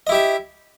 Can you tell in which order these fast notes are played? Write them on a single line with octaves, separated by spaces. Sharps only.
D#5 E4 G4 E5